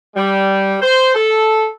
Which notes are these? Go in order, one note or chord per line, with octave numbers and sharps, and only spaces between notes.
G3
C5
A4